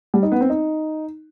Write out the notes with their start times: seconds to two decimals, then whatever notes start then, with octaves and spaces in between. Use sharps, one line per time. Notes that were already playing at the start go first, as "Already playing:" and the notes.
0.14 G3
0.23 D#4
0.32 B3
0.41 C4
0.50 D#4